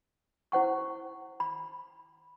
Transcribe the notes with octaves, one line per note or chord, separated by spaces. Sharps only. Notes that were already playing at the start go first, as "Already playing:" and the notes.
E4 C5 F#5 C#6
B5